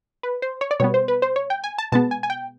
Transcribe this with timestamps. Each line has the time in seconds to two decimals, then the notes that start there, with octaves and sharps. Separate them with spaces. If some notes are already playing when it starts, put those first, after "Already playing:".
0.23 B4
0.42 C5
0.61 C#5
0.71 D5
0.80 B2 G3 B3 C#5
0.94 C5
1.08 B4
1.22 C5
1.36 C#5
1.50 G5
1.64 G#5
1.78 A5
1.92 B2 G#3 B3 A5
2.11 G#5
2.23 G#5
2.30 G5